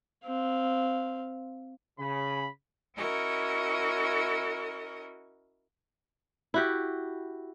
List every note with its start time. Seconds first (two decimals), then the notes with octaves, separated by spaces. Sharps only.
0.25 C4 F5
2.00 C#3 B5
2.97 C#4 E4 F#4 A#4 D#5 C#6
6.54 E4 F#4 G4